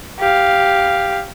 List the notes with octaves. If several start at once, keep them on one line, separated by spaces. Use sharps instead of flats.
G4 F5